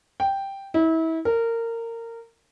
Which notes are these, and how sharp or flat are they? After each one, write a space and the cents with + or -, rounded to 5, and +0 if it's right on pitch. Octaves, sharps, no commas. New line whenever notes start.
G5 +0
E4 -30
A#4 -20